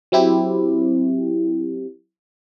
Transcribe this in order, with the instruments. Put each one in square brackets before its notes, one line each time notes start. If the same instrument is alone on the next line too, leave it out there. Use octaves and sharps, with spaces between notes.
[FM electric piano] F#3 C4 E4 G4